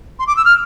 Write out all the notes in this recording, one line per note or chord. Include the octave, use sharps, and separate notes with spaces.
C6
D6
E6
F6